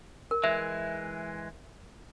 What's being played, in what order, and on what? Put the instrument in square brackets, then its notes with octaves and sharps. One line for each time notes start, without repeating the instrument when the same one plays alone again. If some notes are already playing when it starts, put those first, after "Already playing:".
[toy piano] A#4
[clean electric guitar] E3 G#3 [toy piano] E5